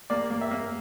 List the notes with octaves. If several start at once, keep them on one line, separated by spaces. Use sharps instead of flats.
A#3 D5
A#3
E5
A#3